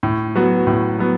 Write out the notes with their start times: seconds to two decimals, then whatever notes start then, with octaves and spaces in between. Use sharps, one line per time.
0.03 A2
0.35 F#3 B3 F#4
0.67 A2
0.99 F#3 B3